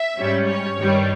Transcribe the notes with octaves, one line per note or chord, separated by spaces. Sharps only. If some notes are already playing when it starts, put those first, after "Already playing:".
Already playing: E5
G#2 G3 C#4
C#5
G2 D#3 G3